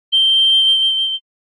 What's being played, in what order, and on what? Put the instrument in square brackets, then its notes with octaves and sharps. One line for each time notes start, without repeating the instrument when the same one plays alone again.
[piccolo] G7